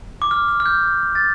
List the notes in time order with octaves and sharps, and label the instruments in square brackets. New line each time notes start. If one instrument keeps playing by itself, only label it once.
[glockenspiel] D6
F6
F6
F6
G6
A6